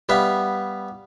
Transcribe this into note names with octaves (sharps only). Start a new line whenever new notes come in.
G3 B3 E5 F5